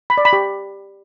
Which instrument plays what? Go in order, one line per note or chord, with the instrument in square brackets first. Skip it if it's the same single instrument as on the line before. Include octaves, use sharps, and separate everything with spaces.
[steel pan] B5
D5
B5
G4